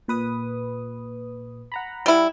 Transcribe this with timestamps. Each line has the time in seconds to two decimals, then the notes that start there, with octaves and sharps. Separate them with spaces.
0.08 A#2 B4 D#6
1.72 F#5 A#5 B5
2.06 G3 E4